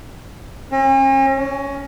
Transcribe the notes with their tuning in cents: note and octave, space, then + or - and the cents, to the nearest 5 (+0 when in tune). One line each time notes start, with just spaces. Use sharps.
C#4 -45
C#4 +10